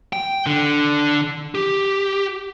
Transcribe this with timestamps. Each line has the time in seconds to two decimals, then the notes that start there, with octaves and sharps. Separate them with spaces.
0.13 G5
0.46 D3
1.55 G4